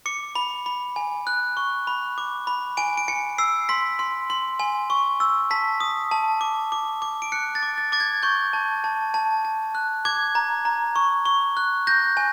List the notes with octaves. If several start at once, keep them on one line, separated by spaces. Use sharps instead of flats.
D6 C#7
B5
B5
G#5
F#6
C#6
B5
D6
B5
G#5 D7
D7
G#5 C#7
E6 C7
C6 B6
C6
C6
G#5
C#6
E6
A5 B6
D#6
A5
D6
D6
D6
D7
F#6 C#7
A6
D6
A6
D6 A6
G#6
C#6 G6
A5
A5
A5
A5
F#6
D6 G#6
A#5
A#5
C#6
C#6
F#6
G6 A#6
G#5